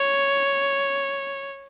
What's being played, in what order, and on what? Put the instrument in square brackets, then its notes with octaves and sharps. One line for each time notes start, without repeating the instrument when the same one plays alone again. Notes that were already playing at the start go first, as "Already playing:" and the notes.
Already playing: [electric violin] C#5